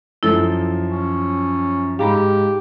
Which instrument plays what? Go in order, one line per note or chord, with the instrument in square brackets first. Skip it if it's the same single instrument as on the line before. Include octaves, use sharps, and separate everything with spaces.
[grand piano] F#2 F3 [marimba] E4 A4
[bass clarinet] C#4
[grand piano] G#2 [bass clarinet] G4 [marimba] F5 A#5 B5